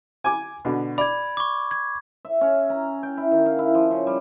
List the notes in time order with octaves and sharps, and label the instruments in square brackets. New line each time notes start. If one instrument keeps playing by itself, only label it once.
[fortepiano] G#5 D6
B2 D3
[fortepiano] D5 [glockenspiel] B5 G#6
[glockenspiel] C#6 D6
G#6
[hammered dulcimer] E5
C#4
A#5
G5
E4
D#3
F5
E4
F3
C#3
G3